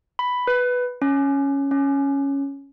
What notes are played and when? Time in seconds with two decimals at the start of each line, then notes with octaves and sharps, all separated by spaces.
0.19 B5
0.47 B4
1.02 C#4
1.71 C#4